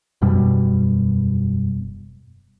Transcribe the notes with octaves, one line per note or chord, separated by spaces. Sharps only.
E1 F#2 B2 G3